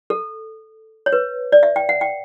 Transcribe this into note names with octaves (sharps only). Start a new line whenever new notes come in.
A4
C#5
B4
D5
E5
G5
F#5
G5